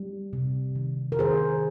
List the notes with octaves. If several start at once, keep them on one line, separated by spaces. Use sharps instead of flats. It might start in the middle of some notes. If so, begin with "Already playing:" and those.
Already playing: G3
C3
D#3
A#4
D#3 G#4 C5